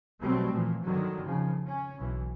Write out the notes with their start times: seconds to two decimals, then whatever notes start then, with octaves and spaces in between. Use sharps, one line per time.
0.22 B2 F#3 G3 A3 C4
0.54 A#2 E3 F3
0.85 G2 D3 D#3 F#3
1.23 F2 C#3 F3
1.66 C#4
1.98 B1 E3